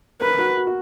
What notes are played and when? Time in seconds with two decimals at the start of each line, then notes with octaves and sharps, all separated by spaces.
0.21 A#4 B4
0.39 F#4
0.57 F#4
0.67 F#4